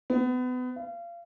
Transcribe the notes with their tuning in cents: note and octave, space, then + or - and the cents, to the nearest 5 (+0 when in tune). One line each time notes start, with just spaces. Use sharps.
B3 +30
F5 -30